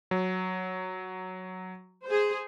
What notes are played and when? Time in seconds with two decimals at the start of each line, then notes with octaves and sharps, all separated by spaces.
0.11 F#3
2.04 G#4 C5